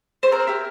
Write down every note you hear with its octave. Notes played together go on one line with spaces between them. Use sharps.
C5
C4 A#4
E4 G4